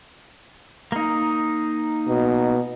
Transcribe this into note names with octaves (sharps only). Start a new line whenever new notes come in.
A#3 D#4
B2